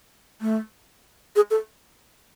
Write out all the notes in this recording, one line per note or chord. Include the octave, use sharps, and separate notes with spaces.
A3
G#4
A4